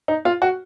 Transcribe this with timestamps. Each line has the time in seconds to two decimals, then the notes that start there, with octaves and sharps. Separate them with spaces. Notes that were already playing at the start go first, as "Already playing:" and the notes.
0.08 D#4
0.25 F4
0.42 F#4